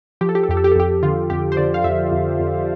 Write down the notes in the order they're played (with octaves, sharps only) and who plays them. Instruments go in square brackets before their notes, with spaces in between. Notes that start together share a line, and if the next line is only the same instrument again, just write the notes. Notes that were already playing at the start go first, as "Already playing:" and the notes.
[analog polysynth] F3 G4
A4
G4
A4
F2 G4
A4
G4
A4
F2 G4
D3 F4
F2 G4
C5
D3 D5
F5
F2 E5
F2
F2